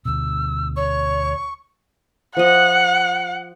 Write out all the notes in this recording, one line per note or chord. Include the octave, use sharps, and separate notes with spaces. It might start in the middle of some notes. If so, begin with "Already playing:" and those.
D2 B2 E6
C#5 C#6
F3 D#5 F#5